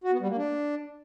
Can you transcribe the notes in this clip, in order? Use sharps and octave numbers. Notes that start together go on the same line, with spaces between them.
F#4
B3
G3
A#3
D4